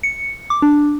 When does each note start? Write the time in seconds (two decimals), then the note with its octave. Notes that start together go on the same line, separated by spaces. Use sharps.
0.03 C#7
0.50 D6
0.62 D4